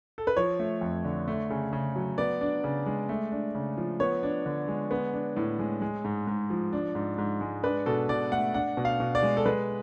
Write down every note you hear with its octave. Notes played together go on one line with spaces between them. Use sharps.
A4
B4
F3 C#5
A3
F2
D3
A3
C#3
C#3
F#3
B3 D5
D4
C#3
G#3
A3
D4
C#3
F3
B3 C#5
D4
D3
G#3
B3
D4
A2
G#3
G#3
G#2
G#2
F3
D4
G#2
G#2
G#3
D4 B4
B2 A4
B2 D5
A3 F#5
D4 F#5
B2
F5
B2
D5
G#3
A4
G#3 B4